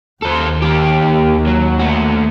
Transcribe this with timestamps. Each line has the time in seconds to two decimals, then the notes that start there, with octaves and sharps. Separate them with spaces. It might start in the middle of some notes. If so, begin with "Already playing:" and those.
0.22 D#2 A4 C5
0.62 A#3 G4
1.47 F#3
1.79 A3 F#4